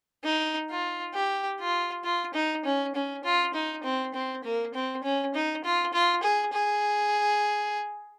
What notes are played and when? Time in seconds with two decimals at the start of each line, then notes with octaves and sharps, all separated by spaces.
0.24 D#4
0.70 F4
1.14 G4
1.60 F4
2.04 F4
2.34 D#4
2.65 C#4
2.95 C#4
3.24 F4
3.54 D#4
3.84 C4
4.14 C4
4.44 A#3
4.74 C4
5.03 C#4
5.34 D#4
5.64 F4
5.93 F4
6.23 G#4
6.53 G#4